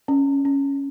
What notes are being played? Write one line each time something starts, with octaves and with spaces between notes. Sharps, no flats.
C#4
C#4